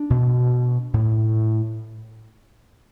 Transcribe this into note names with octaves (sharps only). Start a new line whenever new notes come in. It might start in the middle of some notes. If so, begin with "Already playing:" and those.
Already playing: D4
B2
A2